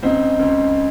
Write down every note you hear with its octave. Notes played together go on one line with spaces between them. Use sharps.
C#2 C#3 C4 D#4
C#2 C#3